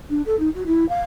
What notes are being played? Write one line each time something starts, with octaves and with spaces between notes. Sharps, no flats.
D4
A4
D#4
F#4
E4
F5